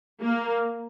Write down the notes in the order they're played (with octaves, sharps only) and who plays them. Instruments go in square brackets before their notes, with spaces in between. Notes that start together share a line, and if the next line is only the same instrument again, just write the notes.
[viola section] A#3